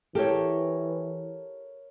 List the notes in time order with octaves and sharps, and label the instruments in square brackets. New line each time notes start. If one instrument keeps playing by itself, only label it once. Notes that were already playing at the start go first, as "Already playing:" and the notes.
[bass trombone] E3 [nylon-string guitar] G4 A4 [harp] A#4 C#5